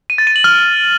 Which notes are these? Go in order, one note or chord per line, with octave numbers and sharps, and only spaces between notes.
D#7
A6
D#7
F#7
F6